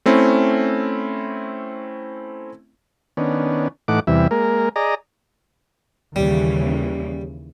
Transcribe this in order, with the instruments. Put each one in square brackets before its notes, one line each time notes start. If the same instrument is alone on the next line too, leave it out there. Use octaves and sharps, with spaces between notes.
[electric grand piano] A3 C4 C#4 E4
[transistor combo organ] D#3 B3 C#4 D4
A2 E3 A3 D#4 F#5 D6
E2 C3 E3 G3 E5
G#3 A#3 A#4
G#4 D5 D#5 A#5
[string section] D#2 C#3 E3 [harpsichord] G3